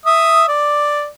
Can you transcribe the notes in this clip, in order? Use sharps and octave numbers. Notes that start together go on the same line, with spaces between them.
E5 D#6
D5